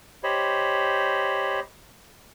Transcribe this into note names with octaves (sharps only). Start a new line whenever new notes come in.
G4 C5 C#5 D#5 B5